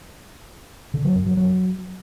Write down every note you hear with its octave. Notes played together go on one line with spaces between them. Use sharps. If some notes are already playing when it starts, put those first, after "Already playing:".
D3
F#3
F#2
F#3
F#3